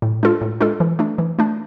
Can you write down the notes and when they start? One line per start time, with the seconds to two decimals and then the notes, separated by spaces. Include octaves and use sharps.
0.02 A2
0.23 G#3 D4 F4 A4
0.41 A2
0.61 G#3 D4 F4 A4
0.80 E3
0.99 A3 D4
1.18 E3
1.39 A3 D4